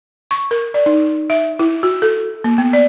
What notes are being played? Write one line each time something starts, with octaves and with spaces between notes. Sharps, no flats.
C#6
A#4
D5
D#4
E5
E4
F#4
A4
A#3
B3
D5